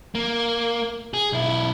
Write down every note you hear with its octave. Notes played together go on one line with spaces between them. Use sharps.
A#3
G#4
B1 E4